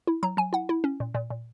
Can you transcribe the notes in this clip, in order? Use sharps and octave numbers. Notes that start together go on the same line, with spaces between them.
E4
F#3 A#5
F#3 G#5
E4 F#5
E4
C#4
A#2
A#2
A#2